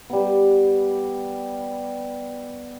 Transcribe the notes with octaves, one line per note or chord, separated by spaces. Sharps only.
G3 B3